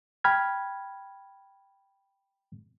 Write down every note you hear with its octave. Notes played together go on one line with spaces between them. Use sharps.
G5 B5 F6 G#6